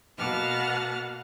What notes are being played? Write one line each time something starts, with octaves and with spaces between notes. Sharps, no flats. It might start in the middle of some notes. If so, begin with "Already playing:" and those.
B2 A#3 F#5 A5 F6